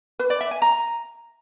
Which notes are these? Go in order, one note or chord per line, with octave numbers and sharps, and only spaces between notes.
B4
D5
E5
G#5
A#5